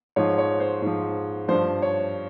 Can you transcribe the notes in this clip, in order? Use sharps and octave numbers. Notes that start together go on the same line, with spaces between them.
G#2 F3 C#5
C#5
C5
G#2 F3
G2 F3 C5
C#5